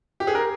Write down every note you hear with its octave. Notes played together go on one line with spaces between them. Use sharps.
G4
G#4
A#4